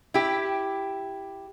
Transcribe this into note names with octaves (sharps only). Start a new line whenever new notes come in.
E4 G4